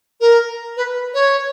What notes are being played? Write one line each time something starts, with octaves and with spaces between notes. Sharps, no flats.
A#4
B4
C#5